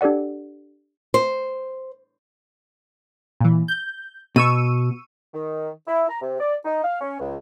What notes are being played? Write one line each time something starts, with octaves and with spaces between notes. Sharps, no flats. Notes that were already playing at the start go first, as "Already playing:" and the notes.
D4 G4 A4 D5 F#5
C5
A#2 E3
G6
B2 C#6 E6 D#7
D#3
E4
A#5
C3
D5
D#4
F5
C#4
C#2